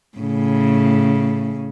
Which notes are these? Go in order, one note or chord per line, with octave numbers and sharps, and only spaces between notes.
A2 C#3